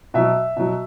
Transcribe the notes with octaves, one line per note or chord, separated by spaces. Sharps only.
B2 F#3 E5
B2 F#3